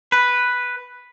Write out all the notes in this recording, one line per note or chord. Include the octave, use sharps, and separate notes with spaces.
B4